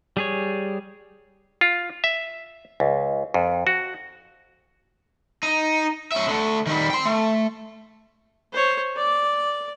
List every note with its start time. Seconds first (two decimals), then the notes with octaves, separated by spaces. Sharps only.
0.17 G3 G#4 C#5
1.61 F4
2.04 E5
2.80 C#2
3.34 F2
3.67 F#4
5.43 D#4
6.12 C#4 E5
6.28 D3 A3
6.66 D#3 G3
6.90 G5 C6
7.05 A3
8.53 C5 C#5
8.96 D5 D6